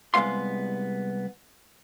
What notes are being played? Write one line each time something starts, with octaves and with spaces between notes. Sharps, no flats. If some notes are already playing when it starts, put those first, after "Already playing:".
C2 G#3 A3 B3 F5 C6